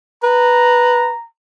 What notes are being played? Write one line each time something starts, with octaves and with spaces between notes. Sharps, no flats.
B4 A#5